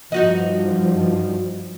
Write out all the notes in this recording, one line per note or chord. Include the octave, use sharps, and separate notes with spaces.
G2 F3 D#4 F#4 D#5